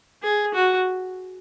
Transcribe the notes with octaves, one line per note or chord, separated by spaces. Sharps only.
G#4
F#4